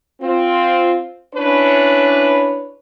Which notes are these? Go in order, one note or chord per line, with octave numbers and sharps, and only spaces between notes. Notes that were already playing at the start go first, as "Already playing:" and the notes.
C4 F4
C#4 D4 E4 B4 C#5